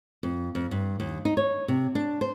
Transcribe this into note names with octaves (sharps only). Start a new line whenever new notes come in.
F2
F2
G2
D#2
D#4
C#5
C3
D4
C5